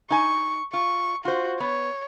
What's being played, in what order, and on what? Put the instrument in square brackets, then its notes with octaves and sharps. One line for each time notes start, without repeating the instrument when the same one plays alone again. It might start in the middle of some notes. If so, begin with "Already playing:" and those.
[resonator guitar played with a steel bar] D#4 G#5 [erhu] C#6
[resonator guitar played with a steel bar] F4 [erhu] C#6
[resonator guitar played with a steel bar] F4 C5 [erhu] F#4
[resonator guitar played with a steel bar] B3 [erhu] C#5